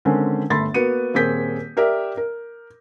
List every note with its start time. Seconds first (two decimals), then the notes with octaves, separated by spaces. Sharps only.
0.05 D3 D#3 G#3 C4 C#4
0.50 G1 A3 B5 C6 A6
0.74 A#3 B3 F#4 C#7 D#7
1.14 D#1 A#3 C4 G#4 G6 B6
1.77 G4 A#4 D5 E5
2.17 A#4